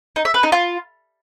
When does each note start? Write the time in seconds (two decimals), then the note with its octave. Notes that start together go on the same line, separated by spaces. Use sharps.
0.16 D#4
0.25 E5
0.34 B4
0.43 D#4
0.52 F4